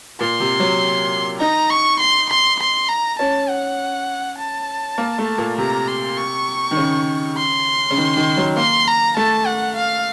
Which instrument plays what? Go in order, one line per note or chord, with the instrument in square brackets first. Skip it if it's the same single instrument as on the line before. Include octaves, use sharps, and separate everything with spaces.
[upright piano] A#2 [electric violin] C6
[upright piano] C3
F#3
[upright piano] D#4 [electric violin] A#5
[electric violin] C#6
C6
C6
C6
A#5
[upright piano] C#4 [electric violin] A5
[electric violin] F#5
A5
[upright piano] A#3
A3
A#2
[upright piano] C3 [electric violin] A#5
[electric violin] C6
C#6
[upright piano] D#3
C#3
[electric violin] C6
[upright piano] C#3
D#3
D#3
F#3
[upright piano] A#3 [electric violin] C6
[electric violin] A#5
[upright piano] A3 [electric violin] A5
[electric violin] F#5
F5